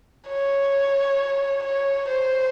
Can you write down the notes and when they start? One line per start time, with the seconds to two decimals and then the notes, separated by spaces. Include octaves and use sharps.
0.28 C#5
1.63 C#5
2.08 C5